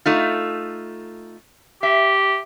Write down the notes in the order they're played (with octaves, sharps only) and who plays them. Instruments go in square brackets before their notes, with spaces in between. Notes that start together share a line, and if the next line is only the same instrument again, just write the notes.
[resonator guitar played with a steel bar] A3 D#4 F4
[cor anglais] G4 [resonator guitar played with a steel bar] E5